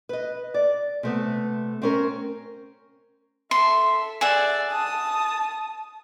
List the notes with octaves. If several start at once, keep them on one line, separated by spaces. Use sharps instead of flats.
B4 D#5
D5
C3 A3 B3
C4 C#4 A#4
A4 E5 C6
G#4 D5 E5 F#5
A5 D#6